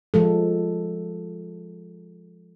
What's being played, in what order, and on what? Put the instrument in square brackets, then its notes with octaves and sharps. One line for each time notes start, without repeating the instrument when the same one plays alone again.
[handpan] F3 G#3 A4